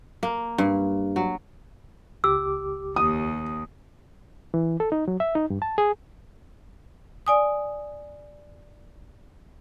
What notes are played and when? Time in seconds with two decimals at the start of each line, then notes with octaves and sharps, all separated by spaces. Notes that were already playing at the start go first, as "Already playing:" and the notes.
0.23 A#3
0.58 G2
1.16 F#3
2.24 C#2 G4 D6 E6
2.96 D#2 D#6
4.54 E3
4.80 A4
4.92 D#4
5.08 F#3
5.20 E5
5.35 D#4
5.50 G2
5.62 A5
5.78 G#4
7.27 D5 G#5 D#6